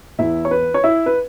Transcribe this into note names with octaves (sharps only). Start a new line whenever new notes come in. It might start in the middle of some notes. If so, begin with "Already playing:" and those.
E2 E3 E4 E5
C#5
B4
C#5
E4 E5
B4